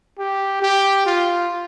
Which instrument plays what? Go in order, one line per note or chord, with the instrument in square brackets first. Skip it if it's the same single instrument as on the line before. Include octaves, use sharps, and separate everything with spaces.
[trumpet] G4
G4
F4